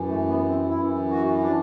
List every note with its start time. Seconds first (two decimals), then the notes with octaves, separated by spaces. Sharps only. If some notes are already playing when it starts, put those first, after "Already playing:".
Already playing: F#2 E3
0.09 A3
0.29 B3
0.49 C4
0.69 F#2 E3 E4
1.10 F#4
1.42 D4